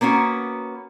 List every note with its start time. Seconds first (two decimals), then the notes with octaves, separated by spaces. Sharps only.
0.01 A#3 B3 C#4 F#4